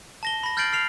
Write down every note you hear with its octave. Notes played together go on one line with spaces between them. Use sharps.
A5 A#6 G7
B5 A#6
F6 G6 A6 C7 D7 F#7
F6 C7 F7